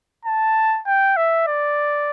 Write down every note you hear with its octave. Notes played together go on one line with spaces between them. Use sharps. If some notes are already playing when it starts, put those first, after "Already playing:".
A5
G5
E5
D5